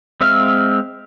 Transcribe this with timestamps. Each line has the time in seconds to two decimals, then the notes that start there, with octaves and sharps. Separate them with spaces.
0.21 G#3 C4 E5 F5 F6